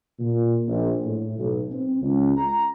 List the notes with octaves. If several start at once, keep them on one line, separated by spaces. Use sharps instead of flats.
A#2
A#1
A2
B1
C4
C#2
A#5